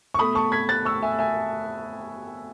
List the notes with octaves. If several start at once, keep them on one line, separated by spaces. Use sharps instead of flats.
C#6
B2 A3 B5 D#6
A5 C#6
G#6 B6
F#6 A6
C#6 E6
E5 G#5
E5 G#5